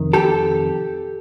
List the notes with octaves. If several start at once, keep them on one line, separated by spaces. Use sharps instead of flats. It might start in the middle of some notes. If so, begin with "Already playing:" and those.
Already playing: F2 C3 D#3
G4 A4